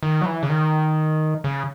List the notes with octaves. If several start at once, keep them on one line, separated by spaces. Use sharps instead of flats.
D#3
F#3
E3
C#3
D#3
C#3